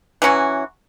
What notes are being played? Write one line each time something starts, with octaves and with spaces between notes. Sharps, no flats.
E3 F#3 C#4 F#4